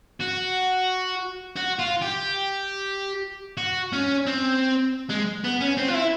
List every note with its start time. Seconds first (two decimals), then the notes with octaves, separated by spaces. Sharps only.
0.21 F#4
1.56 F#4
1.79 F4
2.02 G4
3.58 F#4
3.93 C#4
4.26 C4
5.09 G#3
5.44 B3
5.60 C#4
5.77 C4
5.88 F4
5.94 E4